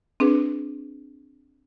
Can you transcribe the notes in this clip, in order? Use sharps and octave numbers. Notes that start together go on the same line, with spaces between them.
C4 D4 G#4 B4